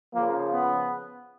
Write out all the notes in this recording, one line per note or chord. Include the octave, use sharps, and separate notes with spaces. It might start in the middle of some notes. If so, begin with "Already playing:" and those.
C#3 F3 A#3
B3